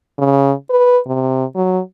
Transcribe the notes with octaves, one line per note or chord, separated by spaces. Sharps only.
C#3
B4
C3
F#3